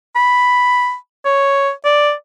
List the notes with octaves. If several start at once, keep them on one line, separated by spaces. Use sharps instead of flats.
B5
C#5
D5